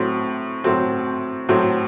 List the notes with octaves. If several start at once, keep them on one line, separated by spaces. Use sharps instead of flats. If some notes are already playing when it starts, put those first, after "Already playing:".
Already playing: A2 F#3 C4
A2 F#3 C4
A2 F#3 C4